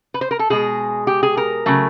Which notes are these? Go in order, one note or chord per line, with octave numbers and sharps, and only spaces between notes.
B4
C5
A#4
A4
B2 G#3 G#4
G4
G#4
A#4
C#3 F#3 A3